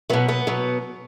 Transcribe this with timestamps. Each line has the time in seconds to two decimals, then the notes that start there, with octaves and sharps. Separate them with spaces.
0.10 B2 F#3 B3
0.28 B3
0.47 B2 F#3